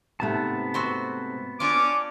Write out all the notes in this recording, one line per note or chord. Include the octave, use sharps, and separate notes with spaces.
G#2 C3 A3 B3 A5
C4 F#4 C5
C#4 D4 F4 D6